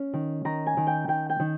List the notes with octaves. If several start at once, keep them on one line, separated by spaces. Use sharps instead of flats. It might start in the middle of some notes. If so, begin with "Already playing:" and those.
Already playing: C#4
D#3
D#3 A#5
G#5
D#3
G5
D#3 G5
G5
D#3